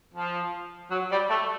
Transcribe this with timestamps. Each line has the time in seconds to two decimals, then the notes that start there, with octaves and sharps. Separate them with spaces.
0.13 F3
0.91 F#3
1.10 G3
1.30 A3